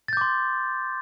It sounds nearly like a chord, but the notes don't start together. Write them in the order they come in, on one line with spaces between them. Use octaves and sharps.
A6 G6 D6 C6